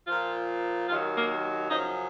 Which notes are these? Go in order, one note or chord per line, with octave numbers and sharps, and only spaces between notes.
A#2 F3 F4
D#2 D#3 F#3 F4
A#3
F#2 C#3 F3 D#4